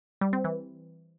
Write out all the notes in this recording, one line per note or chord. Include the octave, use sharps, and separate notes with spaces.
G3
C4
E3